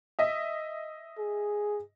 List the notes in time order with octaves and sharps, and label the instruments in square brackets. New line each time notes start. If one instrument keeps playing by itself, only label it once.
[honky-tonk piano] D#5 E5
[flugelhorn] G#4